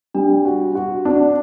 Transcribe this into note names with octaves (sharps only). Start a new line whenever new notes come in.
G3 D4
F#4
F#4
D4